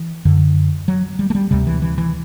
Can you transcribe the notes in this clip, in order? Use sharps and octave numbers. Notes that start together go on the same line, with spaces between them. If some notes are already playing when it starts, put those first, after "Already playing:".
Already playing: E3
F#2 D3
F#3
G3
A3
G3
D2 C3 G3
E3
E3
E3